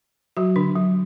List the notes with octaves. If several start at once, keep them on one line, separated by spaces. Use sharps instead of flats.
F#3 F#4
D3 D4
F#3